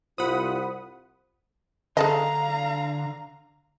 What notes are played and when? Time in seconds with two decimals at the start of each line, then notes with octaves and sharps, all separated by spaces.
0.18 C2 F4 C5 F#5 B5 D#6
1.97 D3 G#4 A4 D#5 F5 A#5